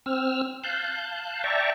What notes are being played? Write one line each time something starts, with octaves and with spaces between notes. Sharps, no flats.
C4 E6 F6
F5 A5 F#6 G6
D5 E5 G5 A5 A#5 C#6